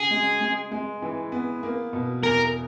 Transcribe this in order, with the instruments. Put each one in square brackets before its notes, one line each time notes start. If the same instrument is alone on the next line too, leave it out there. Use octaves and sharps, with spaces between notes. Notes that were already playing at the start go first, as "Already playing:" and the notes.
Already playing: [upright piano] C#3 F#4 [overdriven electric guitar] G#4
[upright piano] G#3
G#3
G#3
E3
B3
A#3
B2
[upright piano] E2 [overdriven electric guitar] A#4